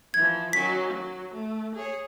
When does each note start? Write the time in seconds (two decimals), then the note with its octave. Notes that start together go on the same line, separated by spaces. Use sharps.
0.14 E3 F3 G#6
0.53 D#3 F#3 C#4 B6
0.89 F#3
1.33 A3
1.74 G#4 C#5